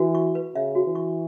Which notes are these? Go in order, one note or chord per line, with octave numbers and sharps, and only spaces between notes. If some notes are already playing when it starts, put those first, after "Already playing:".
Already playing: E3 F#4
C#6
B4
C#3 E5
F#4
E3
C#6